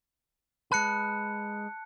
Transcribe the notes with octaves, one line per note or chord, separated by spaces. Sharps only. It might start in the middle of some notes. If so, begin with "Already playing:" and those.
G#3 B4 A5 F#6 C#7